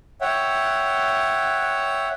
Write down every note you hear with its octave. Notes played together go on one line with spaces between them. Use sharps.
C#5 E5 F#5 G5